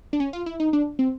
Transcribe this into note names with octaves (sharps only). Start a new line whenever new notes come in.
D4
C#4
F4
E4
D#4
D4
C4